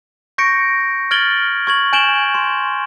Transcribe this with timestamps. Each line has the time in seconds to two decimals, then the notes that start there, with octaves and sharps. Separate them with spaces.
0.38 C#6 G6 A#6 C#7 D7
1.11 F6 G#6 A6 D7 F#7 G7
1.67 C#6 G#6 F#7
1.93 G#5 G6 D7 E7 F#7 G7
2.34 C6